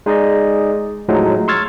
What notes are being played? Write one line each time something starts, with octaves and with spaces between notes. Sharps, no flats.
G#3 D#4 G#4 D5 D#5
A2 F3 F#3 G#3 A3 D#4
C6 C#6 E6 F6 G#6 A6